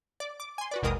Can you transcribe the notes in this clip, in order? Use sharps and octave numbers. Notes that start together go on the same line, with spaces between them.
D5
D6
G#5 C6
F#4 B4 D5
G#1 D#2 B2 G#3 A#4 D#6